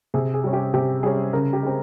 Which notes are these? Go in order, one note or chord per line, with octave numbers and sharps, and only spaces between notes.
C3 G#4
G#4
G3 C#4
G4
C3 G4
G3 C#4 G#4
C#3 A#4
G4
G#3 C4